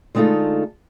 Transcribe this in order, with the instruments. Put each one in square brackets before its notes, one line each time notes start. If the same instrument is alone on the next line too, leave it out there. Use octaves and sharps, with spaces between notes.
[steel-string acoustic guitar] D3 G#3 A3 D#4 F4 A4